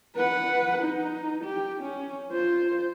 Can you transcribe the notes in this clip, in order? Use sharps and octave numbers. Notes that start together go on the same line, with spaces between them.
B4 F#5
D#4
G4
C#4
F4 C5